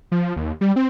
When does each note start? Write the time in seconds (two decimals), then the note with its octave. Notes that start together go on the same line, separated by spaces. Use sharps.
0.12 F3
0.36 D#2
0.61 G3
0.76 C4